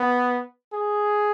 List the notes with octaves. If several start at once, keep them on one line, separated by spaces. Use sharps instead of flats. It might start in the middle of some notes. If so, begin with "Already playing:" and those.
Already playing: B3
G#4